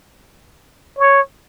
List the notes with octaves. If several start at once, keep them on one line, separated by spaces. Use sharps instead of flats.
C#5